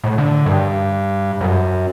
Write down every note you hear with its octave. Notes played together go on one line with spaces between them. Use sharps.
A2
D3
G2
F#2